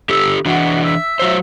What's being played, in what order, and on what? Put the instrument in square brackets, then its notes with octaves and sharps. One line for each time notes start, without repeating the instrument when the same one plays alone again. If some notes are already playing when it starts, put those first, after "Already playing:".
[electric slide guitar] D3 G4 A4 [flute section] E6
[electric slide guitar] E3 D4 [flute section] F#4 E5
[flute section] E5 E6
[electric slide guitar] F#3 C5